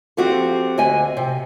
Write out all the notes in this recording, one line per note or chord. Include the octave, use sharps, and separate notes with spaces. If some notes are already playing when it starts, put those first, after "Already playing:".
F3 C4 F#4 G4 A4
D2 D#5 G#5
C3